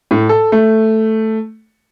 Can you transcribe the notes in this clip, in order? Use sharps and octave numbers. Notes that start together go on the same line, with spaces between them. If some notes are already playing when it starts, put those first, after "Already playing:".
A2
A4
A3